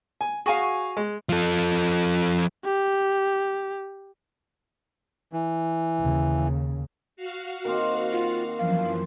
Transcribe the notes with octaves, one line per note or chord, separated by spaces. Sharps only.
G#5
F#4 G#4 F5 G#5 C#6
G#3
F3 A4
G4
E3
D#2 C#3
F#4 F5
D#3 A#3 C4 A#4
F4
F#2 E3 F3 F5